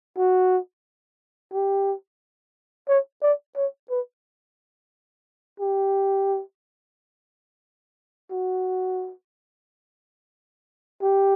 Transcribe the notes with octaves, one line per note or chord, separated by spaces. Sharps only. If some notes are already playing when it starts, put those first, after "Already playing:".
F#4
G4
C#5
D5
C#5
B4
G4
F#4
G4